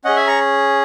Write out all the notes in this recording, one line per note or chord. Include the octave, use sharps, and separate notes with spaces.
C#4 G#4 D#5 F#5
E5 G#5
A#5 C#6